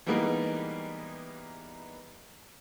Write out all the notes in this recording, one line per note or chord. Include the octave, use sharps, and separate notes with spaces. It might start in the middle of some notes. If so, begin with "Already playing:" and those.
E3 G3 G#3 A#3 B3 D#4